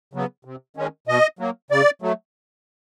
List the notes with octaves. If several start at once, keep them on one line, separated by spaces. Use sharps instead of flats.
C#3 F#3 B3
C3
D#3 G#3 C#4
B2 D#5
F#3 A#3
C#3 D5
F#3 A3